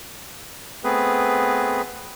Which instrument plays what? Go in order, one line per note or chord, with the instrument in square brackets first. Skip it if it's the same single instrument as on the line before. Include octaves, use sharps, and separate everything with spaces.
[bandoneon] A3 B3 C4 G#4 B4